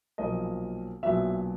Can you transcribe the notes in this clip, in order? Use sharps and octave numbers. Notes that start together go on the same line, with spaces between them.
B1 A#2 F3 A#3 D#5
B1 A#2 F#3 B3 E5